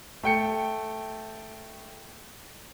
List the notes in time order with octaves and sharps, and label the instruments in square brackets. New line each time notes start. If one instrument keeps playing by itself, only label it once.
[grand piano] A3 G5 C#7